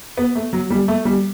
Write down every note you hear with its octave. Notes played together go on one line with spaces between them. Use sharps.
B3
A3
F#3
G3
A3
G3